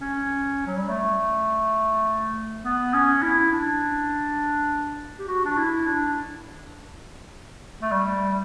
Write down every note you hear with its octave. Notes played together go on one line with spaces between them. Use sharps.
C#4
F#3
G3
A3
B3
C#4
E4
D4
G4
F#4
D4
E4
D4
A3
G3